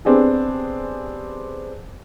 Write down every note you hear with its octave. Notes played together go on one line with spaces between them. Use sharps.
B3 C4 D4 G4 G#4